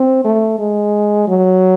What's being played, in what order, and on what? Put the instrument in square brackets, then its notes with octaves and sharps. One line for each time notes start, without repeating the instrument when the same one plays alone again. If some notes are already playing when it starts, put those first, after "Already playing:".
Already playing: [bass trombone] C4
A3
G#3
F#3